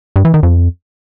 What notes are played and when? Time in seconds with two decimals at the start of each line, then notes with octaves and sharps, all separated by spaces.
0.16 G2
0.25 E3
0.34 D#3
0.43 F2